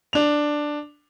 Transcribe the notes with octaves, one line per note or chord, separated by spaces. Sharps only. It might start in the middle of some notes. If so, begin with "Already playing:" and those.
D4 F7